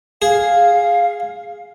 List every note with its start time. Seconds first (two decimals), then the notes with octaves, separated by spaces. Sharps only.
0.22 G#4 F5